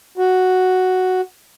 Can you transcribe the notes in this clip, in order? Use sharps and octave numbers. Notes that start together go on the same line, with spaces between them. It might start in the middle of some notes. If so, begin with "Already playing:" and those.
F#4